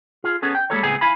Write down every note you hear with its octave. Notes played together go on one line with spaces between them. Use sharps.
F4 G#4
B3 C#4 G#4 A4
G5
G3 G#3 A#3 A4 A#4 C#5
C#2 A2 B3 C4 G#4 G#5
E4 F5 G#5 B5